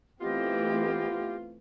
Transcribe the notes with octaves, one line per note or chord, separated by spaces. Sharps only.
E3 A3 B3 C4 F4 G4 D#5